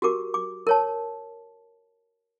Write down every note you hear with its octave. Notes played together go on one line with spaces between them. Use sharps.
F#4 G4 A#4 D6
D6
A#4 C#5 A5